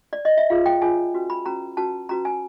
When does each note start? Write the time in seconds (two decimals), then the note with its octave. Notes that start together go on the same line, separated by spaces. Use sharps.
0.13 D5
0.25 D#5
0.37 E5
0.50 F4 G#4 C#5 F5
0.66 G5
0.82 F4 G#4 C#5 G#5
1.14 C#4 F#4 B4
1.30 B5
1.46 C#4 F#4 B4 A#5
1.77 C#4 F#4 B4 A5
2.09 C#4 F#4 B4 A#5
2.25 G#5